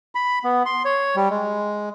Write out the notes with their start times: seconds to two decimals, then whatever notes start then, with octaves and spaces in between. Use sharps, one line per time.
0.15 B5
0.44 B3
0.66 C6
0.85 C#5
1.16 G3
1.30 G#3